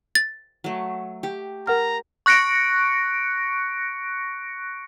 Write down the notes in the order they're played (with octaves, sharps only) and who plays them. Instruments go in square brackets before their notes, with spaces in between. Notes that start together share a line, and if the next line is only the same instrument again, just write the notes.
[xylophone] A6
[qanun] F#3 A3
G4
[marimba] A#4 F#5 F6 [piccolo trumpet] A#5
[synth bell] C#6 F#6 A#6 C#7 D7